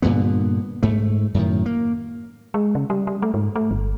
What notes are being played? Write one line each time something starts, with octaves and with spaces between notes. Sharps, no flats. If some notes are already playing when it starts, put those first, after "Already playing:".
G2 A#2 D3 B3
G#2 A3
F#2 A2 D#3
A#3
G#3
C#3
G3
G3
A3
G#2
A3
G1